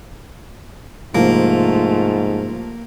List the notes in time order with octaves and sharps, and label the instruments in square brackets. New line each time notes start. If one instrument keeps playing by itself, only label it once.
[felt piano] C2 F3 [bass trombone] G#2 [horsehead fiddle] A3 F4 [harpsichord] A#3